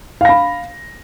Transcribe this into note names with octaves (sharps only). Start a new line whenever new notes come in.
F5 B5 A#6